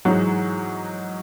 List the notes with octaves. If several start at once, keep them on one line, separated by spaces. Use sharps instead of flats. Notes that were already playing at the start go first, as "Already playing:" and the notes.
G#2 E3 F#3 G#3 D#4